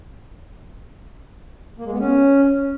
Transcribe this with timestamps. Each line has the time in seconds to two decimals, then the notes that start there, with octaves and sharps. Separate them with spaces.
1.78 A#3
1.85 G#3
1.92 B3
1.99 C#4